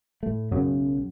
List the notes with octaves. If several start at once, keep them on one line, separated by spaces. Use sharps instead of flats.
A2 A3
B1 F#2 C#3